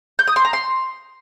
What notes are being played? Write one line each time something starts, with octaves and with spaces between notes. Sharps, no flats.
G6
D#6
C6
A#5
C6